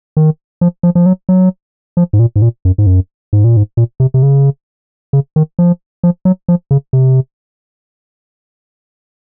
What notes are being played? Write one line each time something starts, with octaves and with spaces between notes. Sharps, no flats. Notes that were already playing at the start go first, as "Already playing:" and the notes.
D#3
F3
F3
F3
F#3
F#3
F3
G#2
A#2
G#2
A#2
F#2
G#2
F#2
G#2
A#2
G#2
A#2
C3
C3
C#3
C#3
D#3
F3
F3
F#3
F3
C#3
C3